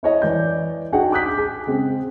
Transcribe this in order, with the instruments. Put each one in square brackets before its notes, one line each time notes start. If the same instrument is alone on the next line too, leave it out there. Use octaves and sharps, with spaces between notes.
[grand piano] E4 C#5 D#5
E3 D5 G6
D4 D#4 F#4 G#4 F#5 G5
G#5 D6 D#6 F#6 G6 B6
G#4
C#3 G#3 C4